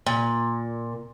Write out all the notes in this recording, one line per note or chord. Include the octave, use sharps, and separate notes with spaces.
A#2